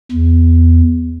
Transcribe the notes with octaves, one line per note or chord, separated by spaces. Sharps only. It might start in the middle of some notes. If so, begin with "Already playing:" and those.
E2